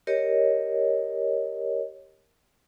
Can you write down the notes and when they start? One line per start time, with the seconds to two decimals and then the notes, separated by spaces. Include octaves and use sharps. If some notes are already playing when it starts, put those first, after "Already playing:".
0.07 G4 A#4 C#5 D#5